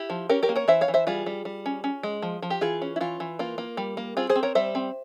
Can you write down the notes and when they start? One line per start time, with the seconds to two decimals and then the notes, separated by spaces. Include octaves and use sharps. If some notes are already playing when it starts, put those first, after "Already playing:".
Already playing: E4 G4
0.10 F3
0.29 C#4 G4 A#4
0.43 G4 A#4
0.49 A#3
0.56 A#4 C#5
0.68 E3 C5 E5
0.81 C#5 F5
0.88 E3
0.94 C5 E5
1.07 G3 F4 G#4
1.26 G3
1.45 G3
1.66 C#4
1.84 C#4
2.03 G#3
2.22 F3
2.42 F3
2.50 G4
2.61 E3 F4 G#4
2.82 C#4
2.96 E4
3.01 E3 F4
3.20 E3
3.39 A#3 F4
3.58 A#3
3.77 G3
3.97 A#3
4.17 C4 F4 G#4
4.29 G#4 C5
4.36 C4
4.43 A#4 C#5
4.55 G3 C5 E5
4.75 C4